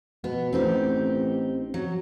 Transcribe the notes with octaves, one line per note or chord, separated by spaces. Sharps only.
B2 B3
A1 C4 D#4 G4
F#3